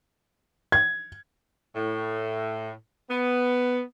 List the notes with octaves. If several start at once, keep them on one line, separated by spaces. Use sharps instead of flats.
G#6
A2
B3